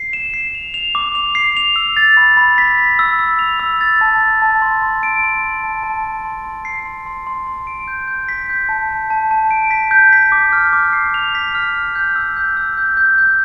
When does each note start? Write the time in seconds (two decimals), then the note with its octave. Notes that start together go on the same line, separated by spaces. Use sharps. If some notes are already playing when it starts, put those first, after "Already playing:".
Already playing: C7
0.13 E7
0.34 C7
0.55 F7
0.74 F7
0.95 D6
1.15 F7
1.35 C7
1.57 F7
1.76 E6
1.97 A6
2.17 B5
2.37 B5
2.58 B6
2.78 B6
2.99 E6
3.19 E6
3.39 F7
3.59 E6
3.81 A6
4.01 A5
4.21 A6
4.42 A5
4.62 C6
4.82 C6
5.03 D7
5.23 C6
5.43 C6
5.63 A5
5.83 A5
6.05 A5
6.25 C6
6.45 C6
6.65 C7
6.86 C6
7.06 C6
7.27 C6
7.47 C6
7.67 D7
7.88 G6
8.08 G6
8.29 B6
8.50 G6
8.69 A5
8.89 A5
9.10 A5
9.31 A5
9.51 D7
9.71 B6
9.91 G6
10.13 B6
10.32 D6
10.52 F6
10.73 D6
10.93 C7
11.14 F7
11.35 B6
11.55 F6
11.75 F6
11.95 G6
12.16 E6
12.37 G6
12.57 E6
12.78 G6
12.97 G6
13.18 G6